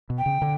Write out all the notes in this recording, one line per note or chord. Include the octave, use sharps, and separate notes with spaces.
B2
G5
C#3
D3